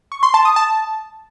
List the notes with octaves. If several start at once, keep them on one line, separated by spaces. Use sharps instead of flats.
C#6
C6
A5
D#6
A5